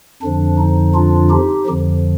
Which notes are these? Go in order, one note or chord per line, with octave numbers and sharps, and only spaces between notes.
F2 D3 F3 D4
D#4
D4 F4
D#4 G4
F2 D3 F3